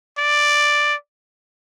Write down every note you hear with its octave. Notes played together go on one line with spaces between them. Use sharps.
D5